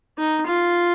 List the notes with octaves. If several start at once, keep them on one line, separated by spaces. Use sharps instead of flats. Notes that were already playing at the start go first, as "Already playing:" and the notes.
D#4
F4